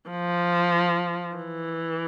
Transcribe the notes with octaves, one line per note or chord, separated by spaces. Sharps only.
F3
E3